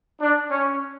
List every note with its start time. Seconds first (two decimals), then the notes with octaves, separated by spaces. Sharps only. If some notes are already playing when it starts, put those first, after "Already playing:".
0.20 D4
0.50 C#4